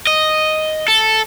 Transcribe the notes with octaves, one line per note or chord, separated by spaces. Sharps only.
D#5
A4